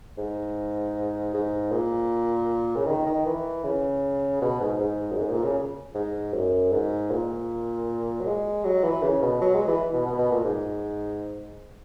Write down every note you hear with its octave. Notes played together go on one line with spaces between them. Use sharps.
G#2
G#2
A#2
C#3
D#3
D#3
E3
C#3
B2
G#2
G#2
F#2
G#2
A#2
C#3
G#2
F#2
G#2
A#2
F#3
G#3
F#3
E3
C#3
B2
F#3
G#3
E3
B2
B2
B2
A#2
G#2